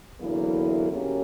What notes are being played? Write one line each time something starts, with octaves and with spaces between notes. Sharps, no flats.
E2 D3 F#3 A#3 E4
C#3 F#3 A#3 C#4 G4